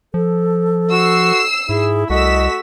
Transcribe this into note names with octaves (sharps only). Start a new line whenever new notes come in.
F3 A4
F#4 E6 C7
G#2 E4 G#4
C2 A3 F#4 D#5 E6 B6